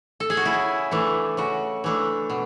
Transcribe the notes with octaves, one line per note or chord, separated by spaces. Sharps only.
A4
G#4
F#4
C#3 E4
E3 A3 D4
C#3 F#4
E3 A3 D4
B2